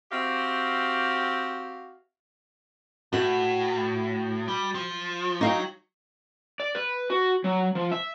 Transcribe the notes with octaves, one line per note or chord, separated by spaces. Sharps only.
C4 F#4 G4 E5 F5
A2 F#4 F#5
G3
F3
F#3 D#4 F5 G5
D5
B4
F#4
F#3
F3
E5